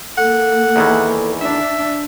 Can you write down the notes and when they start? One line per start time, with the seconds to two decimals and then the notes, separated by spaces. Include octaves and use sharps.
0.18 A#3 A4 F#5
0.76 E2 D#3 E3
1.41 D4 E5